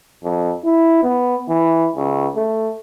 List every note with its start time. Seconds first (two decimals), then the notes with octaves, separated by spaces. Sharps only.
0.24 F2
0.64 E4
1.03 B3
1.49 E3
1.97 C#2
2.36 A3